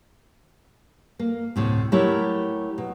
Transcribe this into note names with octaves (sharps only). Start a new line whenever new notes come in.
A#3
D2 A2 C3
F#3 A3 E4 G4 A#4 C#5
B2